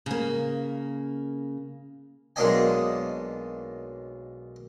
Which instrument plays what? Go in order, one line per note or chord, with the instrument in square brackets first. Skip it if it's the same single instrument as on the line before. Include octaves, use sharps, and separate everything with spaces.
[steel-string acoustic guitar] C#3 A#3
[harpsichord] B1 G#3 A#3 D4 D#5 G#5